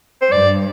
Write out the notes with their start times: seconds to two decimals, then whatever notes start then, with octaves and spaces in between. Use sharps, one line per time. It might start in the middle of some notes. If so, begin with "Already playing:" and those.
0.22 C5
0.32 G2 D5